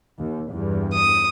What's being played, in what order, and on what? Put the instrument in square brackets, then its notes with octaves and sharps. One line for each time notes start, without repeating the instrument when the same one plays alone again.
[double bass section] D#2
E2 G2
[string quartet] D#6